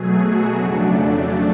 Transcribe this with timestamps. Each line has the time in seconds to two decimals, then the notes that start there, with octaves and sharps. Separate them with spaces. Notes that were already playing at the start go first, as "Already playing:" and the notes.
Already playing: B2 F#3 A3 G#4
0.20 F#4
0.56 F2 C#3 F#3 A3 D4